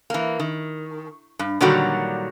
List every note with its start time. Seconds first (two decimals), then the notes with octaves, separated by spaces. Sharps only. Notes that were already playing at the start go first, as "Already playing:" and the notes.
0.10 E3 A#3
0.40 D#3
1.39 G2
1.61 A#2 D3 D#3 F#3 G3 F#4